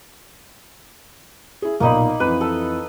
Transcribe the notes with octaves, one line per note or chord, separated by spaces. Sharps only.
E4 G#4
B1 A#2 A#3 D#4 B5
F2 E3 B4
A4